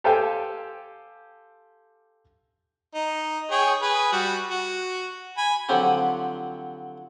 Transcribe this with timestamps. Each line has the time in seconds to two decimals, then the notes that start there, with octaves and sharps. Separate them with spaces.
0.04 G4 A4 C5 F5 G5 G#5
2.95 D#4
3.51 G#4 C#5 G5
3.82 G#4 B4
4.13 G3 F#4
4.51 F#4
5.37 G#5 B5
5.69 D3 F3 F#3 C4 F4 G4